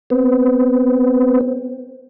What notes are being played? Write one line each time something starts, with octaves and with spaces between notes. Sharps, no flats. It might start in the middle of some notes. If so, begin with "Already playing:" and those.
B3 C4